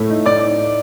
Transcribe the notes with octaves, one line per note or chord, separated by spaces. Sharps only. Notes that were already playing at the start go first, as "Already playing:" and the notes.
Already playing: A2 A3
D#4
A2 D5 D6
D#4